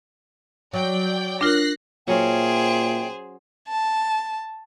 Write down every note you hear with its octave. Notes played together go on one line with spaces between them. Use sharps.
F#3 D5 G5
D4 F4 A#4 F#6 A#6 C7
A#2 F#3 C#4 G#4 C5 C#5 E5 G5
A5